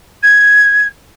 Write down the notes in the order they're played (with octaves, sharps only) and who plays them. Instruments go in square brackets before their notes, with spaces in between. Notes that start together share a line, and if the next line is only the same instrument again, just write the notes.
[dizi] G#6